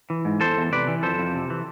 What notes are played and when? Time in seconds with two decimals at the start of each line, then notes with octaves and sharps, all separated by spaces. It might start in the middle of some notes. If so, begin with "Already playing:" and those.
0.10 E3
0.25 G#2
0.41 E2 A4 C5
0.57 E2
0.72 C3 B4 D5
0.88 E3
1.03 F2 A4 C5
1.19 F2
1.34 C3
1.50 E3